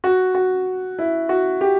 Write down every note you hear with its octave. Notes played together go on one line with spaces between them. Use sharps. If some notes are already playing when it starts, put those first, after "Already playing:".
F#4
F#4
E4
F#4
G4